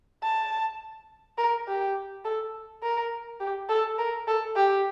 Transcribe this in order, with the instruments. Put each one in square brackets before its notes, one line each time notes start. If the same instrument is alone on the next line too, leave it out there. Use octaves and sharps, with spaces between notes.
[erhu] A5
A#4
G4
A4
A#4
G4
A4
A#4
A4
G4